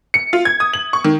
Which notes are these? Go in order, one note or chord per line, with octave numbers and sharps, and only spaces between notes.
C#7
F4
G#6
D#6
F#7
C#6
D#3